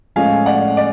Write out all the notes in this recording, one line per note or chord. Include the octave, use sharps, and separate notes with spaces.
A2 F3 G#3 C#4 F5 G#5
D5 F#5
D5